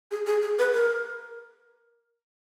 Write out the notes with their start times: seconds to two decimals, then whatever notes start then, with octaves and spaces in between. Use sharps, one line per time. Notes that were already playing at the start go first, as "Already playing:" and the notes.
0.11 G#4
0.27 G#4
0.42 G#4
0.59 B4
0.74 A#4